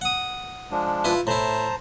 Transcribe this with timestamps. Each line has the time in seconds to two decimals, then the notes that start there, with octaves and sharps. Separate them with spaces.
0.01 F#5 D#6
0.71 F3 G#3 D4
1.04 E4 F4 B4
1.27 A2 E4 C5 A5 A#5